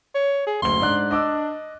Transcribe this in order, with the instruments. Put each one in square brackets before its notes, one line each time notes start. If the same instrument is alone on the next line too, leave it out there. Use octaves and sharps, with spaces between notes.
[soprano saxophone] C#5
G#4
[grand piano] F#1 D2 G7 [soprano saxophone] C6
[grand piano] G#2 D4 F#6
[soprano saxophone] D4 [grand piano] D#5 D6 E6